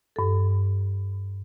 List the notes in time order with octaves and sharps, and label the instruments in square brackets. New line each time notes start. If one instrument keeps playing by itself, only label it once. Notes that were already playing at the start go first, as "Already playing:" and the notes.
[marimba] G2 A4